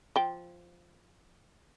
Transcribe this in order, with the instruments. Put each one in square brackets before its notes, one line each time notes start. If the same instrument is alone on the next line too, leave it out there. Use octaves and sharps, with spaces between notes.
[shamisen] F3 G5